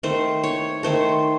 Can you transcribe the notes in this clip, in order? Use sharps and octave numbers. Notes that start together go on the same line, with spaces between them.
D#3 A3 C5
C#5
D#3 A3 C5